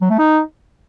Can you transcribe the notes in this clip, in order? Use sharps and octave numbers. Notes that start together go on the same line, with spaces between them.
F#3
A3
D#4